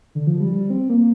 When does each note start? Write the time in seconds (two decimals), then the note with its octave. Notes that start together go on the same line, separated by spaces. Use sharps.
0.15 D3
0.27 F3
0.40 G3
0.52 G3
0.70 C4
0.89 A#3